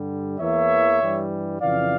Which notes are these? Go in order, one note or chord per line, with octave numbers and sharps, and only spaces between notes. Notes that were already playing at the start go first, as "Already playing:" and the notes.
Already playing: G2 D3 G3
E2 E3 A#3 C#5 E5
G2 E3 G3
F2 C#3 E3 D5 F5